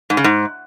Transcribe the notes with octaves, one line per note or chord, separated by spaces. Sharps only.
G#2
C#3
G#2